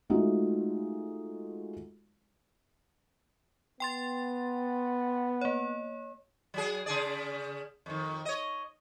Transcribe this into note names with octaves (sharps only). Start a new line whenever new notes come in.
G#3 A3 D#4 F4 F#4
B3 G5 C6 A6
A#3 C#5
F#3 G#4
C#3 G#4 D5
F2 D#3
C#5 D#5